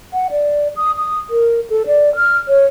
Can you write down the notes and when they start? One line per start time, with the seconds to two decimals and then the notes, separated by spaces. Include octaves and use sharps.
0.13 F#5
0.31 D5
0.76 D#6
0.97 D#6
1.30 A#4
1.70 A4
1.87 D5
2.16 F6
2.48 C#5